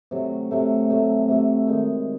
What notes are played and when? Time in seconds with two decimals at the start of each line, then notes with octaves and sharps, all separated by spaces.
0.11 C3 F#3 A3
0.51 C3 F#3 A3
0.90 C3 F#3 A3
1.28 C3 F#3 A3
1.68 D#3 G#3 D#4